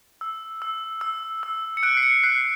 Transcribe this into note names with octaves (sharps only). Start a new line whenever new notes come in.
E6
E6
E6
E6
C#7
F#6 D7
C7
C#7
F#6 C7